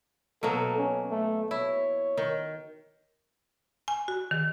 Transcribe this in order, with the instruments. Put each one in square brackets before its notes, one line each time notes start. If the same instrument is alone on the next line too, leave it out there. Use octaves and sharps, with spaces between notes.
[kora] B2 F#3 A#3 [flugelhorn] A4
[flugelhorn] C#4
A3
[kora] E4 [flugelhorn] C#5
[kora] D#3
[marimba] G#5
F#4
D#3